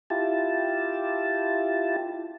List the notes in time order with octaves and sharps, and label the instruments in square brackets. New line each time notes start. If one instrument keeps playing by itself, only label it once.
[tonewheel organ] E4 F4 G4 A5